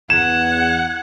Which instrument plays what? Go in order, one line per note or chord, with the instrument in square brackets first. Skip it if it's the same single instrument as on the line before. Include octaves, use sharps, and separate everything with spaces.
[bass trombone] E2 [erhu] F#5 [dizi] G#6 [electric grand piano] E7